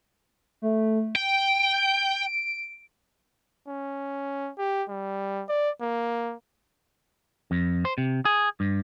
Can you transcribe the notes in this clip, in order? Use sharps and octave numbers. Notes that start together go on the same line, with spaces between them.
A3
G5 D7
C#4
G4
G3
D5
A#3
F2
C5
C3
G#4
G2